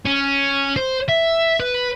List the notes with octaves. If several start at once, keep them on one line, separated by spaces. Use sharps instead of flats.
C#4
C5
E5
B4